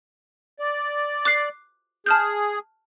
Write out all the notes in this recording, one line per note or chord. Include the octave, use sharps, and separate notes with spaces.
D5
D6 F#6 C7
G#4 A5 F6 G6